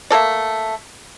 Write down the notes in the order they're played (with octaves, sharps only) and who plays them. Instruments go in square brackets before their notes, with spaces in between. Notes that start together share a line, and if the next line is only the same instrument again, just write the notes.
[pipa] A3 A#3 A4 D5